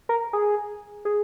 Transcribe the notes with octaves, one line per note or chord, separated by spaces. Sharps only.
A#4
G#4
G#4